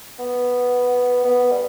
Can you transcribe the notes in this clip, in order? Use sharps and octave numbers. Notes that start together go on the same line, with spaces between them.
B3
B3
G3